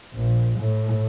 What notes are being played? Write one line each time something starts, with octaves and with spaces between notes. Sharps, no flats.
A#1
A2